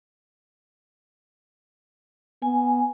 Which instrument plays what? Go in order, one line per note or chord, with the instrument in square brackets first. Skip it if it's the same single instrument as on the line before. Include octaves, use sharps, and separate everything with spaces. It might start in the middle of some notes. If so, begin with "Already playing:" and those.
[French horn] B3 [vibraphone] G#5